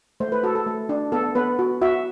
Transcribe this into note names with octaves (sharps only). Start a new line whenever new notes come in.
A3 C5
B4
F#4 A4
A4
A3
D4
B3 A4
B3 B4
F#4
F#4 E5